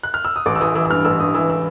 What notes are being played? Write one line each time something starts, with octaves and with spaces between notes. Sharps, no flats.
F#6
F6
E6
D#6
A1 D6
E6
E3 D#6
E3 E6
E6
G2 F6
A1 E6
G2 D#6
E3 E6
E6